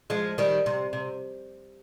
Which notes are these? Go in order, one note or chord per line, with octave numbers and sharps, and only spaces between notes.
F3 G#3
D#3 G3
C3
C3